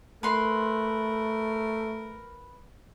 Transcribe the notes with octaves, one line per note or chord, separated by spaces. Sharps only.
A3 A#4 B4 C6